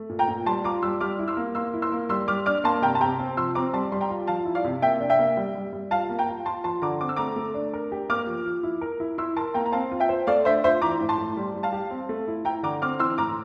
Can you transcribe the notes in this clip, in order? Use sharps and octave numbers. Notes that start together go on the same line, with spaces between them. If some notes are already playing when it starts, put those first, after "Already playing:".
Already playing: A3
A#2
G5 A#5
A#2
G3 A5 C6
F4 A#5 D6
G3 C6 E6
G3 D6 F6
E4
C6 E6
A#3
A#3 C6 E6
E4
C6 E6
A#3
G3 C6 E6
G3 D6 F6
D4 D6 F6
A#3 A5 C6
C3 G5 A#5
A5
C3 G5 A#5
C4
F3 C6 E6
C4 A#5 D6
G3 A5 C6
G3 C6
G5 A#5
F4
F3 F5 A5
E4
D5 F5
C3
A#3 E5 G5
D4
E5 G5
A#3
G3
G3
G3
F4 F5 A5
A#3
G5 A#5
F4
F4 A5 C6
F3 A5 C6
D3 A#5 D6
C4 D6
E6
A3 A#5 D6
A3
D4
A#4
G4
A#3 D6 F6
F3
F3
E4
A#4
E4
E4 C6 E6
A#4 A5 C6
A#3 G5 A#5
A#5
C4 F5 A5
F4
E5 G5
C5
A3 D5 F5
D4 C5 E5
F4 C5 E5
E3 A#5 D6
A2
A5 C6
A2
G3
G3
F5 A5
G4
C4
A3
E4
E4 G5 A#5
D3 A#5 D6
C4 D6 F6
E3 C6 E6
A2 A#5 D6